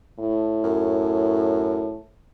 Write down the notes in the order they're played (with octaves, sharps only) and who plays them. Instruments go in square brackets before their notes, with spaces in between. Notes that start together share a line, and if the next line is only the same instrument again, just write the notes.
[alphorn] A2
[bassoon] F#2